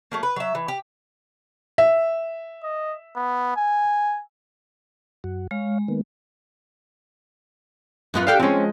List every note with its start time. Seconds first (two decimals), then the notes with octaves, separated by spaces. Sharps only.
0.12 F#3 A3 A#3
0.23 B4
0.36 F#3 E5
0.55 E3
0.68 G4
1.78 E5
2.63 D#5
3.16 B3
3.56 G#5
5.24 F#2 F#4
5.51 G#3 C#5 F5
5.88 D#3 A#3 B3
8.14 F#2 B3 F4
8.27 D4 G4 A4 F5 G5
8.40 F3 G#3 C4 C#4